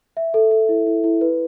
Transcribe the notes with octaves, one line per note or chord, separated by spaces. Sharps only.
E5
A4
A4
E4
E4
E4
B4